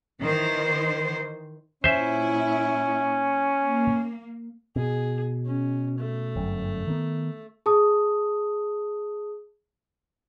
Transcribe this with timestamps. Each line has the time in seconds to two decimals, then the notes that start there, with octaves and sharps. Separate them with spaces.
0.22 D#3 E3 C5
1.84 A#2 C#4 E4 C5 E5
3.63 A#3
4.76 B2 G#4
5.46 C#4
5.98 A3
6.36 G1 F#2
6.87 D#3 B3
7.66 G#4 A5 D#6